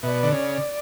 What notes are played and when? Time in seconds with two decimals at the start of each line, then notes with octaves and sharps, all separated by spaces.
0.02 B2 D5 E5
0.23 D3
0.32 C#3